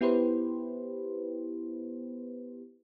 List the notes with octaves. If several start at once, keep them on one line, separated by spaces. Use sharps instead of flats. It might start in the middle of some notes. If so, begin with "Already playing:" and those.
B3 E4 G4 B4 C5